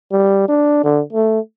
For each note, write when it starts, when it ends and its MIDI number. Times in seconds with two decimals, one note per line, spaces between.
0.12 0.44 55
0.48 0.82 62
0.84 1.02 50
1.12 1.39 57